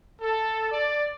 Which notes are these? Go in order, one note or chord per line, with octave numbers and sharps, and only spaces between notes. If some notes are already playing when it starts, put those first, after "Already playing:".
A4
D5